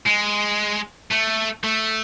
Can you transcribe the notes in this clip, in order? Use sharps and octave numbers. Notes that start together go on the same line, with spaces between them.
G#3
A3
A3